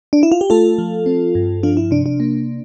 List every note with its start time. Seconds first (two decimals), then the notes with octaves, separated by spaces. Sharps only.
0.13 D4
0.23 E4
0.32 F4
0.41 G4
0.50 A3 F4 A4
0.78 F3
1.06 C4
1.35 G2
1.63 F3 D4 F4
1.77 E4
1.91 C3 D4
2.06 D4
2.20 A#3